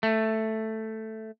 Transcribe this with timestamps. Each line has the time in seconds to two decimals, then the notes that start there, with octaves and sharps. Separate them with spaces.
0.03 A3